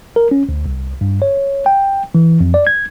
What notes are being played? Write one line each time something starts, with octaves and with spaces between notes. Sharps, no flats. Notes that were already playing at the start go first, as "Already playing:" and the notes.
A#4
C#4
D2
C2
G2
C#5
G5
E3
F2
D5
G#6